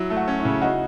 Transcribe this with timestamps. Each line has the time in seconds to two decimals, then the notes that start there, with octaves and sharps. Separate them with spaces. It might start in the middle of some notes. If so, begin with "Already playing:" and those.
Already playing: F#3 E4
0.10 A3
0.17 F#4
0.28 C#4
0.39 E4
0.45 C#3
0.61 D#4 F#4